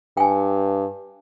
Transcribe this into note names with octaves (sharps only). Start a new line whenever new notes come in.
G2 G5 G#5